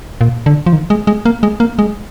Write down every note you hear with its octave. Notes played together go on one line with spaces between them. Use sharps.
A#2
D3
F3
D#3
G#3
G#3
A#3
G#3
A#3
G#3